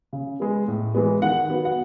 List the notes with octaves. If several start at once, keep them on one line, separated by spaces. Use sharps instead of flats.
C#3
G#3 B3
A2
E3 G#3 B3
D#3 F#5
F#3 B3
F#5